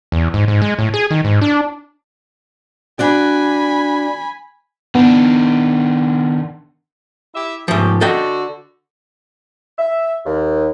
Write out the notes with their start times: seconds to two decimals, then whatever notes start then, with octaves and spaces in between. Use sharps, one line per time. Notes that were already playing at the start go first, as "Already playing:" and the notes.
0.12 E2
0.34 G#2
0.48 G#2
0.62 G#3
0.79 A2
0.94 G#4
1.11 D#3
1.25 G#2
1.42 D4
2.99 D4 F#4 D5 G#5 B5
4.95 D#3 B3 D4
7.35 E4 G4 E5
7.68 G#2 F3 A3 G4
8.01 D3 F#4 A4 D#5 G5
9.78 E5
10.25 D#2